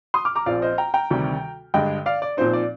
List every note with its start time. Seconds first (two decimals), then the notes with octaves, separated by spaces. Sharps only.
0.14 C6 D#6
0.25 D6 F6
0.35 A#5 D6
0.46 A#1 A#2 F3 C4 F4 D5 F5
0.62 C5 D#5
0.78 G5 A#5
0.94 G5 A#5
1.11 D2 C3 D#3 G3
1.74 G2 D3 G#3 D4 D#5 G5
2.06 D5 F5
2.22 D5
2.37 A#2 F3 C4 D#4 C5
2.53 D5